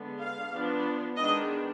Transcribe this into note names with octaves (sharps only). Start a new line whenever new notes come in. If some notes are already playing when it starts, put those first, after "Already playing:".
Already playing: D3 G#3 B3
F5
F3 B3 D4
D#3 G#3 B3 D4 D#5